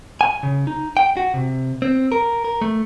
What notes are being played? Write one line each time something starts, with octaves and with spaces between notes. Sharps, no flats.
G#5
C#3
D#4
G5
F#4
C3
C4
A#4
A#4
A3